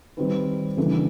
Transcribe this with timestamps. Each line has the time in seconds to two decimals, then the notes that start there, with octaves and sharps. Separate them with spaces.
0.17 D#3 G3 C4 D#4 B4
0.77 C#3 E3 G3 A#3 D4 A4